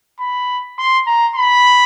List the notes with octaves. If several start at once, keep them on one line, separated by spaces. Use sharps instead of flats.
B5
C6
A#5
B5